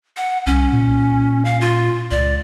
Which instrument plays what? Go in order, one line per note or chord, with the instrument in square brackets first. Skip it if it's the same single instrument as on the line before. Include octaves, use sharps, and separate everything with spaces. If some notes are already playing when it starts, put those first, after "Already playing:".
[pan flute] F#5
[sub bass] C2 [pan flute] C#4
[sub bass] A#2
[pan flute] F5
F4
[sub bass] C#2 [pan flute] D5